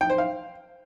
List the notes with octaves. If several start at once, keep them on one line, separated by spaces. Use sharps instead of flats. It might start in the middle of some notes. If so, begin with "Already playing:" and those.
G5
C5
F5